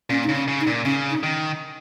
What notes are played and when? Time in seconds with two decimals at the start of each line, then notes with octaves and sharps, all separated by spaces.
0.10 A#2 C#4
0.24 D#4
0.29 C#3
0.35 C#4
0.48 C#3
0.60 D#4
0.67 A#2
0.85 C#3 C#4
1.11 D#4
1.23 D#3